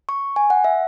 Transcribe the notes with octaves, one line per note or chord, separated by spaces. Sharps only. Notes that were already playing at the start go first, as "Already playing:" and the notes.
C#6
G#5
F#5
E5